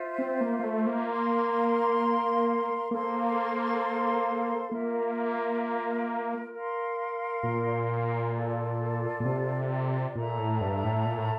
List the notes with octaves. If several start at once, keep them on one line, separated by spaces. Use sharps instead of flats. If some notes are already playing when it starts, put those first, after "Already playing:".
Already playing: F4 C5 E5
C4
A#3
A#3
A3
A#3
A#4 F5 C6
A#3 A4 C5 F5 C6
A#3 F4 A#4 E5
A#4 F5 C6
A#2
F4 A4 D5
A#2
C3
A#2 A4 E5 A#5
A2
G2
A2
A#2
A2